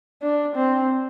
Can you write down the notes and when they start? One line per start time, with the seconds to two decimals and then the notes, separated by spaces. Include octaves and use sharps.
0.22 D4
0.56 C4